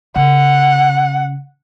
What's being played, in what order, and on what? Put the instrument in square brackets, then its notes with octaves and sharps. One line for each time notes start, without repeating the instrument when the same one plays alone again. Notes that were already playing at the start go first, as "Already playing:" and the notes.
[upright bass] C#3 [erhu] F#5